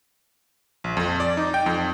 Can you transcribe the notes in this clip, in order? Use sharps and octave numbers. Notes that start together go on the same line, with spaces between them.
A#1
F2
D5
D#4
G5
F2